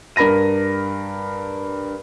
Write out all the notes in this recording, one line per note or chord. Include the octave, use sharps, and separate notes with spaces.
G2 A#4 B5 A#6 D#7